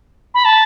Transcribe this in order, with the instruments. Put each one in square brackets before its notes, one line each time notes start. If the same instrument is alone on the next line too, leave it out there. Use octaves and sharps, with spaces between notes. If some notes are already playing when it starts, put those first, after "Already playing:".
[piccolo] B5
A5